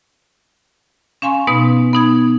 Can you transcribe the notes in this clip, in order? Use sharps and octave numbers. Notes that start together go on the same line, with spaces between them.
C#4 F5 G#5 C6 C#6
B2 B3 D#4 B4
B3 D#4 G#6